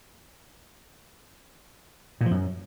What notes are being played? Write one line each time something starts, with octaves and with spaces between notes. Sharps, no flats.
A#2
F3
F#2